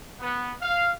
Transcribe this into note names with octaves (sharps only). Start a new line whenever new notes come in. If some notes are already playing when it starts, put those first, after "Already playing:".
B3
F5